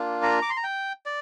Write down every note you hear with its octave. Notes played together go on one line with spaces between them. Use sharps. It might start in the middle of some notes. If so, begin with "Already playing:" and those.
Already playing: A#3 D4 F4
A#5
D6
C6
A#5
G5
D5